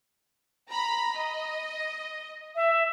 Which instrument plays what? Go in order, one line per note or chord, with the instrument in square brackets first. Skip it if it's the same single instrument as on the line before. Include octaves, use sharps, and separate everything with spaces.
[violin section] A#5 B5
D#5
[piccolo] E5